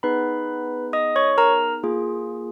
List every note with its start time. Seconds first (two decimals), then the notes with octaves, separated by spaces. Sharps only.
0.03 B3 D#4 G#4 B4 B5
0.93 D#5 D#6
1.16 C#5 C#6
1.38 A#4 A#5
1.83 A#3 F4 G#4